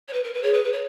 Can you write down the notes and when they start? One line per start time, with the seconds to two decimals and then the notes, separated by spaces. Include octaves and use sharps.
0.08 C#5
0.13 B4
0.24 A#4
0.34 B4
0.43 G#4 C#5
0.54 B4
0.64 B4
0.73 C#5